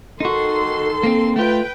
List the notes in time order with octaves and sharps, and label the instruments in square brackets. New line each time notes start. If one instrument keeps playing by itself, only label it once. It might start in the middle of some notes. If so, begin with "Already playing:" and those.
[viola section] D#3 A4 C6 [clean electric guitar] D#4 F#4
[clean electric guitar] A#3 C4
[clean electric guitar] A3 F4 [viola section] B4 G5